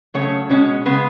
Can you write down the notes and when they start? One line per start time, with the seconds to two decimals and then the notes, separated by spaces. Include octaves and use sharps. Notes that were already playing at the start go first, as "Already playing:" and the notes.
0.14 C#3 F#3 A3 C#4 C#5
0.49 B2 G#3 C#4 C#5
0.85 C#3 G#3 B3 B4